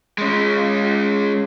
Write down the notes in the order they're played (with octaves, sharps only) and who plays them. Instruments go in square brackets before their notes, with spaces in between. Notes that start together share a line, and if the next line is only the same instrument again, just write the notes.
[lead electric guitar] G#3 C#4